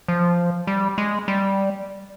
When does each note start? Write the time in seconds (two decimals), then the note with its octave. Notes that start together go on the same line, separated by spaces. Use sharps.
0.08 F3
0.67 G3
0.98 G#3
1.28 G3